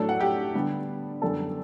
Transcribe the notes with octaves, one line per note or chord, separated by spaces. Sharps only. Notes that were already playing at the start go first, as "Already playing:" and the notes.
Already playing: A2 F#3 A3 D4 A4
F#5
G4 G5
D3 G3 B3 D4
F#2 D3 G3 B3 D4 A4 A5